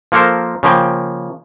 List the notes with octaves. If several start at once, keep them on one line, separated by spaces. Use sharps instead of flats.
F3 A#3 A4 A#4 C5
C#3 F3 A#3 G5